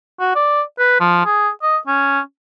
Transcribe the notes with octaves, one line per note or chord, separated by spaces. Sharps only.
F#4
D5
B4
F3
G#4
D#5
C#4